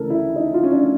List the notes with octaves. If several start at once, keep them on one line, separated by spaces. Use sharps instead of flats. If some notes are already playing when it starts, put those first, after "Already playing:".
Already playing: D2 C#3 E3 A4 A#4
E4
D#4
F4
C#4
D4